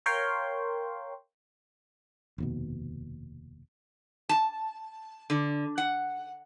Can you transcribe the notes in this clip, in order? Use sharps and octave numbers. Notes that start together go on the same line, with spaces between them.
A#4 C#5 F5 G5 C6
F1 D#2 B2
A5
D3
F#5